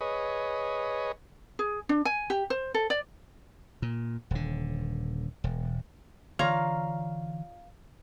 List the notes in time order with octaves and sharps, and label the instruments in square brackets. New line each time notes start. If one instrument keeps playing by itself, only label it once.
[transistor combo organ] G#4 B4 C#5 D#5
[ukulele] G#4
D4
G#5
G4
C5
A4
D5
[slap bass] A#2
D#1 D3
E1
[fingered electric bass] D3 E3 [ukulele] F4 C#5 D5 [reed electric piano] F5 [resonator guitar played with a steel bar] A#5